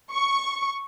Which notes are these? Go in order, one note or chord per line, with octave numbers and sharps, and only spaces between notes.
C#6